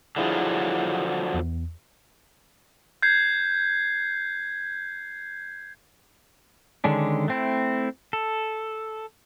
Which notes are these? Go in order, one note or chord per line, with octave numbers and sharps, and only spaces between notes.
D3 F3 F#3 D4 E4 G#4
E2
G6 G#6 C7
D3 D#3 G#3 C#4 D4
A3 C4 E4
A4